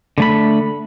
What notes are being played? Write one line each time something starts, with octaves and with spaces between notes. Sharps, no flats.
D3 A3 B5